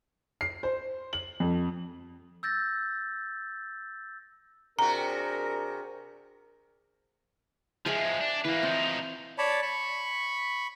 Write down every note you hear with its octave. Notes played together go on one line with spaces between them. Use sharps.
C7
C5
F#7
F2
E6 G6 A6 A#6
C3 D4 F#4 G#4 A#4 A#5
F3 G#3 G#4 E5 G#5
D4
E3 A#3 B4
F3 C4 D#4
C#5 D5 A5 B5
B5 C#6